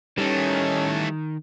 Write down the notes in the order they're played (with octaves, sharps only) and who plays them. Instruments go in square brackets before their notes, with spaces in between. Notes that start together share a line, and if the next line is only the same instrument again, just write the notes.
[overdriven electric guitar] D#3 [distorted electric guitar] E3 A3 [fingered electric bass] G3 [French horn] C#4